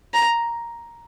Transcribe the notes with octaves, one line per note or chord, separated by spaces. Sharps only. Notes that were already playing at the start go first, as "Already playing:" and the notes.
A#5